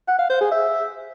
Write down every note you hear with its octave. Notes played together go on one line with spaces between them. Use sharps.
F#5
F5
C5
G#4
E5